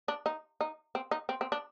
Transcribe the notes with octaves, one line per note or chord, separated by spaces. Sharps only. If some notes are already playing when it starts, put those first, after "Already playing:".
D4
D#4
D#4
C4
D#4
C4
C4
D4